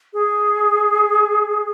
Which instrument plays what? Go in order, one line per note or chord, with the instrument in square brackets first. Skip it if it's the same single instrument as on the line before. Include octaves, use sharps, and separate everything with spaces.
[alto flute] G#4